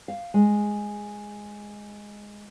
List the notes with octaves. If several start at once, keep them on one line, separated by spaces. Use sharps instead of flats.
F5
G#3